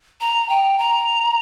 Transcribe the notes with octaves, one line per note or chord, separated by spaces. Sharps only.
A#5
G5
A#5